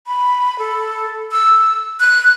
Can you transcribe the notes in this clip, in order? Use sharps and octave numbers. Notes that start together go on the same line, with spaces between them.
B5
A4
E6
F#6